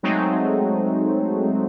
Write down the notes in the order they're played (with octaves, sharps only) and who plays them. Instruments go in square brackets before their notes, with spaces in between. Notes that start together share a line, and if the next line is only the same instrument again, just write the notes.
[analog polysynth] F#3 G#3 A3 C4 D#4